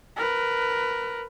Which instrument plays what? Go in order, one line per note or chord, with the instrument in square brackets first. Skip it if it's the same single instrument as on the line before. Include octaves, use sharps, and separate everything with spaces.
[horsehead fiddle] A#4 B4